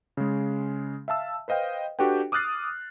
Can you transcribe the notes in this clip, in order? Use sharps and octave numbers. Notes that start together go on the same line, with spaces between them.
C#3 G#3
E5 F5 A5 E6
B4 C5 D#5 F5 G5
D4 F#4 G4 A4 B4 G5
D6 D#6 F6 F#6 A6 C7